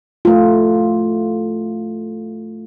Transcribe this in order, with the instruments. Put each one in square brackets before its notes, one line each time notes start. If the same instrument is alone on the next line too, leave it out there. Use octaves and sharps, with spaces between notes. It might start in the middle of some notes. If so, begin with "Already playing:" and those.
[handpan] A3 F4